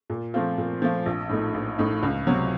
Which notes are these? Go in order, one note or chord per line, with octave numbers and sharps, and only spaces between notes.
A#2
F3 A3 C4 F4
A#2
F3 A3 C4 F4
A#1
A2 A3 D#4
A#1
A2 A3 D#4
C#2
C3 F#3